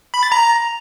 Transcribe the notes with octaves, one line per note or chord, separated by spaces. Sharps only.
B5
A6
A#5